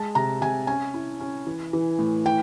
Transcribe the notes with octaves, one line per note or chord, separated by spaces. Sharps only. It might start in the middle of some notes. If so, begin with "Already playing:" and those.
Already playing: G#3 A5
C3 A#5
C3 G#5
C#4 G#5
E4
C#4
E3
E3
A2
E3 G5